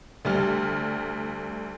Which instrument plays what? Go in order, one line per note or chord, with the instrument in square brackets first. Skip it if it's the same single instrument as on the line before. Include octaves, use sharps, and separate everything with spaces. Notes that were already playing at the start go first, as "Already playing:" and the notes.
[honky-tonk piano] D2 G3 F6